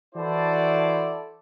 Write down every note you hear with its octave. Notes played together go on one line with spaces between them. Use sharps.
E3 E4 F#4 A4 C5 D5